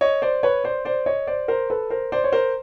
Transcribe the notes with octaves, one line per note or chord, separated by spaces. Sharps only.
C#5 D#5
C5 D5
B4 C#5
C5 D5
C5 D5
C#5 D#5
C5 D5
A#4 C5
A4 B4
A#4 C5
C5 D5
C#5
A#4 C5